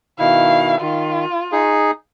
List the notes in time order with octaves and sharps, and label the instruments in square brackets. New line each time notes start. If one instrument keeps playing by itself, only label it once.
[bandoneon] B2 D#3 E4 [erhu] F5
[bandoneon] D#3 [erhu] F4
[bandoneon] D#4 G#4